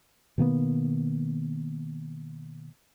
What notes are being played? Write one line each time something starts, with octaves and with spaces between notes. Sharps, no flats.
B2 D#3 A#3 B3